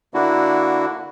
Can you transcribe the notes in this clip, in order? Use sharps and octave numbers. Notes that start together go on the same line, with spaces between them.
D3 A#3 D4 E4 F#4